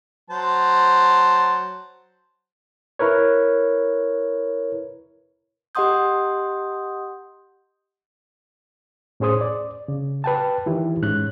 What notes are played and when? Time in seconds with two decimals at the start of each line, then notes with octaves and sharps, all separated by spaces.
0.30 F#3 C5 A5
2.99 E4 A#4 B4 C#5
5.75 G4 D#5 F#5 C6 D#6 G6
9.20 A2 C#4 G#4 C5 D#6
9.41 D5
9.88 C#3
10.24 B4 G5 A5
10.66 D#3 E3 E4 G4
11.02 G#2 C#4 F#6